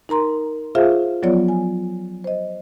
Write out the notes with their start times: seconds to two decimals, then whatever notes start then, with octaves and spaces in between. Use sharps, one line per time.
0.09 D#4 A#4 A#5 C6
0.75 F4 G#4 C5 E5 F5
1.23 F3 F#3 B3 F4 C#5 D5
1.48 G#5
2.24 C5 D#5